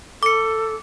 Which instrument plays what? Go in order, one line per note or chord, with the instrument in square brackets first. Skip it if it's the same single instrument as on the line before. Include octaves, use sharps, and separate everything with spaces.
[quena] A4 [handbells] D6 C#7